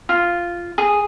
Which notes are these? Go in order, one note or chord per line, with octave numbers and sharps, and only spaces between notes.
F4
G#4